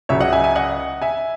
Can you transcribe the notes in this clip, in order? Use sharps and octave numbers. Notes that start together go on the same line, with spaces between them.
C#2 C#3 F#3 C#5 E5
D#5 F#5
E5 G#5
E5 G#5
D#5 F#5
E5 G#5